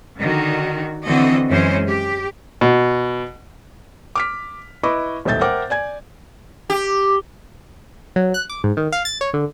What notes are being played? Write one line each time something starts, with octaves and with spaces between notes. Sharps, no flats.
D3 D#3 F#4
D3 E3 C4 F#4 A4 D#5
F#2 E3 G#3 C#4 C5
G4
B2
D6 F6 B6
E4 B4 D#5 C#6 D6
D#1 B1 A2 E5 G6 A6
A#4 C5 E5 F#5 G5 D6
D5 G#5 G#6
G4
F#3
F#6
D6
G#2
D#3
F5
A6
C#5
D3